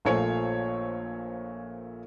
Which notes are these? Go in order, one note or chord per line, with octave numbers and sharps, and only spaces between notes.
A#1 A#2 A3 C5 C#5 G#5